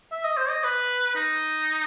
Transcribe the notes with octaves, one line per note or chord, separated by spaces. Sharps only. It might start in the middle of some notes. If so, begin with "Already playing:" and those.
E5
D#5
C5
D#5
B4
D#4